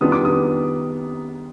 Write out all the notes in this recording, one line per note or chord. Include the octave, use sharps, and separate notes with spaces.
D#3 G3 B3 D4 F4 D#6
D6
D#6